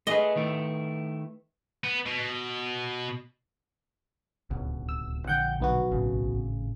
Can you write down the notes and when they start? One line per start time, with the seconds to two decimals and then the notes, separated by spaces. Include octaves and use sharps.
0.07 A3 G4 G#4 B4 D#5
0.36 D#3 A3 E4
1.84 B3
2.06 B2
4.51 D1 C#2 B2
4.89 E6
5.27 A#1 D3 F3 F#5 G5 G6
5.60 B1 B3 F#4
5.91 G#1 A2 C#3